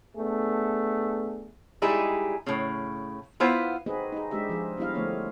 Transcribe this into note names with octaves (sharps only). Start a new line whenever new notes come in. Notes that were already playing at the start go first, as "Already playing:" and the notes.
A3 B3 D4 G#4
G3 G#3 D#4 E4 G#4
A2 C#3
B3 E4 F4 C5
C4 D#4 F#4 G#4 B4 D#5
D#4 G#4
G#3 D4 G4 E5
F3 F4 G#4
G3 B3 D4 E4 D#5 F5
D3 F3 A3 C4 C#5